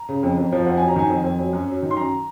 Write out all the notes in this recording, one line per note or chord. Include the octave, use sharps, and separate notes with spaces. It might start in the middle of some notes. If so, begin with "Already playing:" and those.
Already playing: A#5
C#3
F2
F2
F3
F2 F#5
F#3 G#5
A#5
D#3 G#5
F2
F2
F#3
F#2
F#3
D#3
C6
F#2 A#5